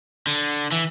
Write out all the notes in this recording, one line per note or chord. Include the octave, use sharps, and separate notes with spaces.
D3
E3